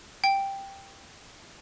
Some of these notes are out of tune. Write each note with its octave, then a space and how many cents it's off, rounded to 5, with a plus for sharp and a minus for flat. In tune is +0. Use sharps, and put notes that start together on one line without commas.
G5 +5